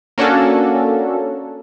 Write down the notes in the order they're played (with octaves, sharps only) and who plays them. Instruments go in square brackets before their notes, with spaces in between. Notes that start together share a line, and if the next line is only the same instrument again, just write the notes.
[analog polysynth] A#3 C#4 D4 F#4 A4